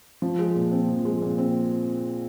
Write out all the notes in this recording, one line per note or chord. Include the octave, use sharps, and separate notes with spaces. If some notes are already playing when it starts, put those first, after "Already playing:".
F3
G#3
A#2
C4
F3
G#3
A#2
C4